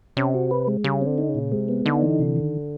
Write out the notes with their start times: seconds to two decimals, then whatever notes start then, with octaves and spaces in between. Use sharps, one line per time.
0.17 C3 C#4
0.34 F#4
0.51 B4
0.68 G#3
0.84 C#3 G3
1.02 D3 C4
1.18 D#4
1.29 C#3
1.35 A#2
1.52 C3 G#3
1.69 B3
1.85 D3 D#4
2.02 E3
2.19 C3
2.36 D#3